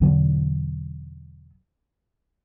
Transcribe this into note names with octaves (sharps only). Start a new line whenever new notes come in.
E1 D3 F#3 B3